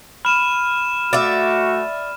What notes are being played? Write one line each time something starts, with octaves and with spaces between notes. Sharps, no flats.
B5 F6 D#7 E7
A3 F#4 D5 E5